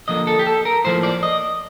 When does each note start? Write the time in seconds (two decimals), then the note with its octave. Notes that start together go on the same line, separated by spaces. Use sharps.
0.08 D3 F3 A#3 D#5
0.27 A4
0.39 G4
0.47 A4
0.65 A#4
0.84 A2 F3 A#3 C5
1.03 D5
1.23 D#5